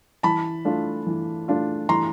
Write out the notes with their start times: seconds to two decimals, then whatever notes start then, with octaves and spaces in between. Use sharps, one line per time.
0.23 E3 A5 B5
0.65 A3 D4 F4
1.07 E3
1.48 A3 D4 F4
1.89 E3 A#5 C6